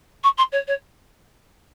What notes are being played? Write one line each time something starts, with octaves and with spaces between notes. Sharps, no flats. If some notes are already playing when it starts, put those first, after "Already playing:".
C#6
C6
C#5
C#5